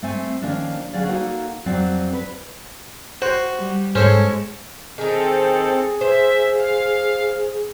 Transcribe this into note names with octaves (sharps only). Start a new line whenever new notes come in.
A3 C4 G#5
D#3 F3 A#3 C#4 D4
D2 F#3 C#4 G#4 D5 F5
A#3 D#4 F#4 A4 F#5
F2 F#3 C4 D5
B4
F#4 C5
G3
G#2 G#3 C#4 A4 C5
D#3 C4 D#4 G#4 A4
C5 E5
F5